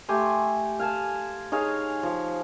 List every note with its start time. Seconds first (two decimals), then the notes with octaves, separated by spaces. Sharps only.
0.09 A3 G4 G#5 C6
0.79 F5 G#5 A5
1.52 D#4 G#4 C#5 F5
2.03 F3